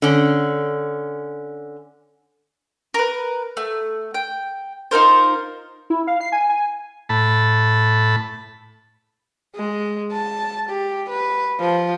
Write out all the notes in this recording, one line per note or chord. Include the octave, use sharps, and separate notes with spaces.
D3 C#4
A#4 B4
A3
G5
D#4 F4 A#4 C5
E4
F5
C7
G#5
G#5
A2 A5 B5
G#3
A5
G4
B4
F3